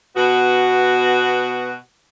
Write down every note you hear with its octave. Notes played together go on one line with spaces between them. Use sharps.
B2 B3 F#4